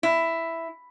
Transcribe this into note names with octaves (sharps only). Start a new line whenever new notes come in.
E4